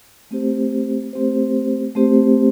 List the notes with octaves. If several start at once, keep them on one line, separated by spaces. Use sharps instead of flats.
A3 C4 G4 C5
A3 C4 G4 C5
A3 C4 G4 C5